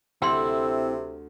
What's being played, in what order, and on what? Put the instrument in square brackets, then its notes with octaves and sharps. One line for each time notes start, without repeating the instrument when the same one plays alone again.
[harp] D2 D4 E6 [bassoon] C3 [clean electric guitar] C4 E4 [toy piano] G5 C6